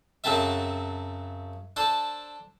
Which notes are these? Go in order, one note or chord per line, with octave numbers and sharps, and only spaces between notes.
F#2 C#3 F#3 C4 A4 E5
D4 A4 C5